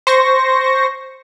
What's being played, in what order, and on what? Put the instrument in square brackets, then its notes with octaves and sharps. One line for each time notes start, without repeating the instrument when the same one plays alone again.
[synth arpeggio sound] C5 C#6 A#6